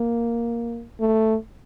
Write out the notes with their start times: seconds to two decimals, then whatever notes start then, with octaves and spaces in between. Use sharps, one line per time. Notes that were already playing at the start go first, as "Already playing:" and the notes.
Already playing: A#3
1.00 A3